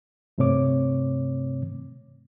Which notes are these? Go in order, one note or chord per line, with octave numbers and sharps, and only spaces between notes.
G2 C3 A3 C4 C#5 D6